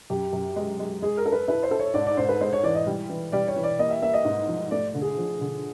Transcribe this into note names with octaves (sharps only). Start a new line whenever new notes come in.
F#2 G4
F#2
G#3
G#3
G#3 G#4
A#4
A4
B4
E4 B4
C5
A4
C#5
G#2 D5
D5
G#2 C5
B4
G#3 C5
C#5
E3 D5
D#5
G3
E3
G3 D5
C#5
E3
D5
A#3 D#5
E5
A#3 E5
D#5
G#2
F3
A3 D5
D3
G#4
F3
D3